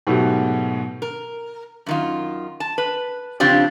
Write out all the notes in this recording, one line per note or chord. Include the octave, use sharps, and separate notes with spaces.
G#2 B2 F#3 A3 F#4 G4
A#4
F#2 D#3 F4
A5
B4
C#3 F3 C4 D4 F4 G4